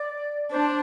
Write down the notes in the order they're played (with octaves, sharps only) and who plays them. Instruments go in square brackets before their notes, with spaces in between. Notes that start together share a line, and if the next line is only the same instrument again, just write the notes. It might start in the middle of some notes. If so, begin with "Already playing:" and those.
Already playing: [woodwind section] D5
[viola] D4 [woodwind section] C5